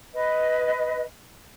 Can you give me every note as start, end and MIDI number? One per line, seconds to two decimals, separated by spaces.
0.14 1.03 71
0.14 1.03 75